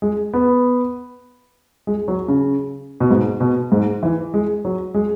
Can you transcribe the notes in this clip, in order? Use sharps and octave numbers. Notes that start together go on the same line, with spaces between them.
G#3
B3
G#3
F#3
C#3
B2
G#2
B2
G#2
E3
G#3
F#3
G#3